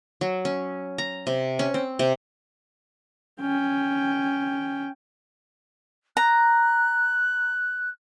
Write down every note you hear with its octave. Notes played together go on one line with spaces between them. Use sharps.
F#3
C#4
A#5
C3
C#4
C4
C3
C#4 G5
A#5 F#6